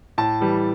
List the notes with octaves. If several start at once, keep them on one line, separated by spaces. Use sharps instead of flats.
A2 A5
E3 G3